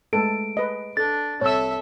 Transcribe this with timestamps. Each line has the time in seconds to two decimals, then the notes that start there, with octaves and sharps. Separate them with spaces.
0.13 G#3 A3 A4 B4 D7
0.57 B4 D#5
0.97 D4 A4 A6
1.41 C2 A4 C#5 E5 E6